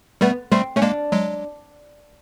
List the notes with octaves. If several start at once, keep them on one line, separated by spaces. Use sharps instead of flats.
G3 A3 B3
G3 A3 C4
A3 C#4
G#3 A#3 D4
F#3 G#3